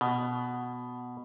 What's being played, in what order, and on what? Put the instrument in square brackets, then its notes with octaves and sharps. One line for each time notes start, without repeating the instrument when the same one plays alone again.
[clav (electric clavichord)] B2